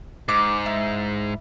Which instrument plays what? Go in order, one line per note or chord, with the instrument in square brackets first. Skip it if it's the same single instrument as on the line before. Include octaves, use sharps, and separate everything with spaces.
[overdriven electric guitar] G#2 [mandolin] D6
[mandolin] E4